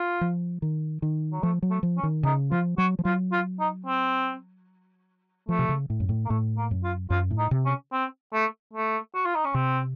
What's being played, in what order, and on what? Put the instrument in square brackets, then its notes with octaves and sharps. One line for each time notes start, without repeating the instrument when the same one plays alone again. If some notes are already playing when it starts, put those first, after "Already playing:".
Already playing: [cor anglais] F4
[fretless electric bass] F3
D#3
D#3
[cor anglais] F#3
[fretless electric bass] F3 [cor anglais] A3
[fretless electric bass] F#3
[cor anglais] A3
[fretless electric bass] F3
[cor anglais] C#4
[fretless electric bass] D#3
[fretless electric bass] C#3 [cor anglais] D#4
[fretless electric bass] F3 [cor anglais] F4
[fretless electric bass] F#3 [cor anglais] F#4
[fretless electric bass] F3
[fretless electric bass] F#3 [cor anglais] F4
[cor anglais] F4
D#4
C4
[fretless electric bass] F3 [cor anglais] A3
[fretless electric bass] C3
C#3
A2
F#2
A2
[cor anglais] A#3
[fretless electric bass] A2 [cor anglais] A3
[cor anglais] A#3
[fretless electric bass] F#2
[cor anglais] F4
[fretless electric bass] F#2 [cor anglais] F4
[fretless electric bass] A2
[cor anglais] D#4
[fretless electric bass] C3
[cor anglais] C#4
C4
A3
A3
F#4
F4
D#4
C#4
[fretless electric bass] C3 [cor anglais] C4